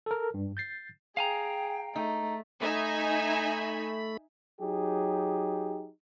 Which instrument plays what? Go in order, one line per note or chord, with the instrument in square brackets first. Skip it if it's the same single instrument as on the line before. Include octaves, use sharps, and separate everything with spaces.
[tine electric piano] A4 A#4
G2
G6 A6 C7
[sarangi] G#4 [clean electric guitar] F5 G#5 A#5 [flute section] G5
[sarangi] A3 [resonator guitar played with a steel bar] D#4
[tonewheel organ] A3 B5 [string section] D#4 E5 G#5
[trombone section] F#3 D#4 G4 G#4